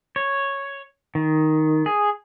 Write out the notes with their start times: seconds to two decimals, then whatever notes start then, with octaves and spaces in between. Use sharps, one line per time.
0.16 C#5
1.15 D#3
1.86 G#4